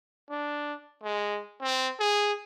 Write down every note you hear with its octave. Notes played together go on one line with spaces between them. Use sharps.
D4
G#3
C4
G#4